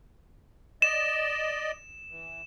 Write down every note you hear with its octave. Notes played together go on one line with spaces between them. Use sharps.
D5 D#5 E7
E3